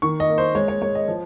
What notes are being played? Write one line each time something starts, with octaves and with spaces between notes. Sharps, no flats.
D#3 C#6
D#5
A#3
C5
G#3 C#5
C#5
G#3 C#5
D#5
F3